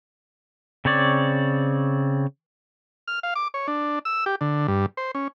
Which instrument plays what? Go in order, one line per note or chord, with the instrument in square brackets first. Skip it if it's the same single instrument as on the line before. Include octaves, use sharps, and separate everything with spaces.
[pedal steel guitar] C#3 C4 C#5 D5
[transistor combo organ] F6
F5
D6
C#5
D4
E6
G4
D3
G2
C5
C#4